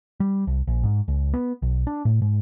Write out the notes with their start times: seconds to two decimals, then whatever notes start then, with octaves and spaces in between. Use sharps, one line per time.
0.20 G3
0.47 C2
0.67 A#1
0.84 G#2
1.08 C#2
1.34 B3
1.62 B1
1.87 D4
2.05 A2
2.22 G#2